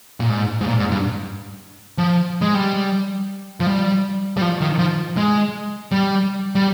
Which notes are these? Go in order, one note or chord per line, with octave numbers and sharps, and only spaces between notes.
A#2
G#2
G#2
A#2
G#2
G2
F3
G#3
G3
F3
G3
G3
F3
D#3
F3
G#3
G3
G3